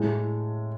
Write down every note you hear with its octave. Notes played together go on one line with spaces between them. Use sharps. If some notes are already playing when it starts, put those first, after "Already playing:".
Already playing: A2 G#3